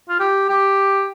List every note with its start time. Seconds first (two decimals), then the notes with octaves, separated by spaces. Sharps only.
0.09 F4
0.20 G4
0.49 G4